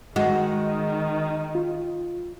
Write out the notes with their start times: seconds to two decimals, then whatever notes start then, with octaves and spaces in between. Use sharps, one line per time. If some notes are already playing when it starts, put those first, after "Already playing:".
0.16 D#3 G#3 F#4
1.55 F4